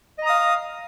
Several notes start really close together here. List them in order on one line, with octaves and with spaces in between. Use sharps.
D#5 A#5 D#6 F5